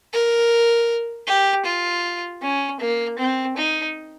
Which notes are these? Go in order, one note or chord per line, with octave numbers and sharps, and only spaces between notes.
A#4
G4
F4
C#4
A#3
C4
D#4